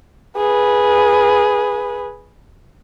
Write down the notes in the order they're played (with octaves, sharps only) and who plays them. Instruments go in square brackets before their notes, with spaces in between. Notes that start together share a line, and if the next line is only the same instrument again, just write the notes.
[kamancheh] G#4 B4